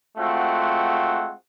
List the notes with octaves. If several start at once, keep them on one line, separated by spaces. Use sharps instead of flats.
G#3 A3 C4 F4 F#4 F#5